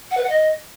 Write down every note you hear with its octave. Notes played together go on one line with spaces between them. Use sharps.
F#5
B4
F#5
D#5